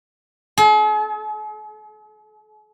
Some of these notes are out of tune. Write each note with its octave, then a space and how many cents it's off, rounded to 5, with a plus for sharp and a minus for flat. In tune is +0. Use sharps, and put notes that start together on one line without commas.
G#4 +45